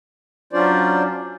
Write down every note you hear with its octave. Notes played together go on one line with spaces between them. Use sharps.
F#3 C#4 D4 F4 C5 D5